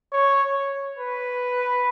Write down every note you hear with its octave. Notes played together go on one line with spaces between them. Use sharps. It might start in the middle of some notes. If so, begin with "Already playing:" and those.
C#5
B4